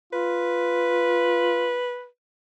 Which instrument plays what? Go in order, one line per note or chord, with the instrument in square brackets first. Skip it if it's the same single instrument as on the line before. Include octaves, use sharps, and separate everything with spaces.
[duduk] F4 [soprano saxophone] B4